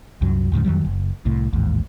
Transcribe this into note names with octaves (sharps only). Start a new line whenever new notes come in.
C2 F#2 F#3
D2 G#2 C#3 F3
F2 D#3 F#3 G3
F#1
C2 A2
A1 D#2 G#2